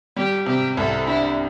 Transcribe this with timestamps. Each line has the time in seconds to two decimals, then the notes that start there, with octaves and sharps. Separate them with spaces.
0.16 G3 G4
0.46 C3 G4
0.77 C2 A4
1.07 D4 E4